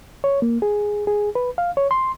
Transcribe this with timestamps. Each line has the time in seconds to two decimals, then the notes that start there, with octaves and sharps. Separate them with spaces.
0.24 C#5
0.42 A#3
0.62 G#4
1.07 G#4
1.35 B4
1.58 F5
1.77 C#5
1.91 C6